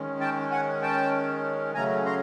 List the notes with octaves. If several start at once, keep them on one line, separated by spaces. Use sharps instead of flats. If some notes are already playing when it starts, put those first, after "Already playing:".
Already playing: D#3 G#3 C#4
G5 A5
F#5 G#5
G5 A5
C#3 F#3 A3 C#4 G#5 A#5
A#5 C6